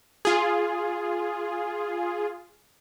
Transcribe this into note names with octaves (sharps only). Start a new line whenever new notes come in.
F4 G#4